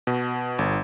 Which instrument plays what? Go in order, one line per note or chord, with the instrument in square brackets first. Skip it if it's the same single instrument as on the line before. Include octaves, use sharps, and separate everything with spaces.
[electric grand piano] B2
G1